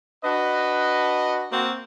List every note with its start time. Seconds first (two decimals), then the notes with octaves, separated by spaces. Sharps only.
0.24 D4 F#4 B4 D#5
1.52 A#3 C4 F#4